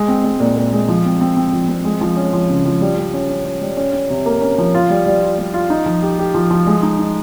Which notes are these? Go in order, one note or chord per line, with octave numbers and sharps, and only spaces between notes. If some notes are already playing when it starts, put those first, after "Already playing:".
Already playing: G#3
C4
G#3
A#2
A#2
G#3
F3
C4
C4
C4
F3
C4
G#3
F3
C#4
F3
C#3
F3
G3
G3
C#4
C#4
C#4
G3
C#4
C#4
C3
A#3
C#4
F3
F4
G3
G3
F4
G3
F4
D#4
F3
G4
G4
F3
F3
G#3
D#4
D#4